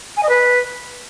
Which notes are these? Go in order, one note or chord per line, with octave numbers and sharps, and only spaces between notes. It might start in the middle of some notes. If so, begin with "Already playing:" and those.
G#5
D#5
B4